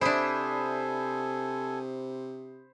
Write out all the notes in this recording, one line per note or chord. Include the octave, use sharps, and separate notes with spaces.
C3 D4 E4 A4 C5 G#5 B5 D#6